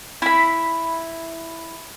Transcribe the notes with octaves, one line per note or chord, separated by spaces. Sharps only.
E4 B5